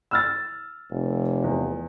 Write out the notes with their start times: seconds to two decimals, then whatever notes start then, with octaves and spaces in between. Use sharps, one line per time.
0.11 E6 F6 A6
0.91 F1
1.44 E2